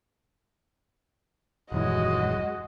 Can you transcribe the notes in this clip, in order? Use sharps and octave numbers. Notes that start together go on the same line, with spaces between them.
D#1 F#2 E3 G#3 F#4 D#5